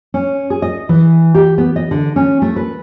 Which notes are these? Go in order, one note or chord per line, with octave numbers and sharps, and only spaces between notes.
C#4
G#4
D#5
E3
G4
B3
D#5
D3
C#4
A3
B4